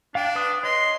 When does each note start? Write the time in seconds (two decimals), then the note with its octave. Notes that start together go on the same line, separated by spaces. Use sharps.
0.15 D4 F5 G5
0.35 B4 D#6
0.63 C#5 D#5 C6